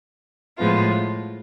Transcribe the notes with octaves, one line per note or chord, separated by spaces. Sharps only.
A2 F3 G#3 B3 F4